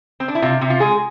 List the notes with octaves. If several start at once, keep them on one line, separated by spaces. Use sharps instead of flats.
C4
D4
E4
C3 F4
C3
F4
G#3 G#4